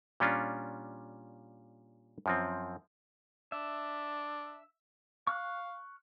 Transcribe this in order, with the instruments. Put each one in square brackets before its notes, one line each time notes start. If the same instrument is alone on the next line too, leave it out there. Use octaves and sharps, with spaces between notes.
[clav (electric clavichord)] A#2 G3 C#4 D4 F4
F#2 F3 C4
[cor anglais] D4 [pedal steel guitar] E5
[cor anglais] F5 [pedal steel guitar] C#6 F6 F#6